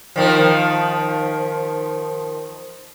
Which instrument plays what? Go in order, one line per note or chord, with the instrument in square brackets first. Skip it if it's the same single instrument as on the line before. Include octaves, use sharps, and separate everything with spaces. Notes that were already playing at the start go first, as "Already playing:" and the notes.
[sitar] D#3 F3